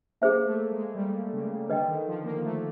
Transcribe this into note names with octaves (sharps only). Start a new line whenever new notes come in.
A#3 G#4 C5 E5
A3
G#3
G3
C#3
D3 B4 D#5 G5
D#3
F3
A#3
A3